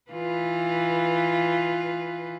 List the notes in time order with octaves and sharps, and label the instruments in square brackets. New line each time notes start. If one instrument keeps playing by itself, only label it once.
[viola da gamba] E3 F4 B4